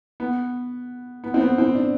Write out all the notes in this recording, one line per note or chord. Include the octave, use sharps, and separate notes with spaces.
B3
B3
C4
B3
C4
D4